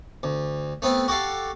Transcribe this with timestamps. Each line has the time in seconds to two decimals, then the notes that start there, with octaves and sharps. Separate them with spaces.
0.23 D2
0.82 A3 B3 C4
1.08 F#4 G4 A4 F5